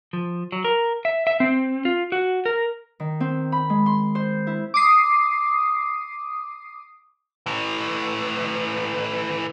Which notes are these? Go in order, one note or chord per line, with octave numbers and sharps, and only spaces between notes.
F3
F#3
A#4
E5
E5
C4
F4
F#4
A#4
D#3
C4
B5
G#3
C6
C5
E4
D6 D#6 C7
A2 E3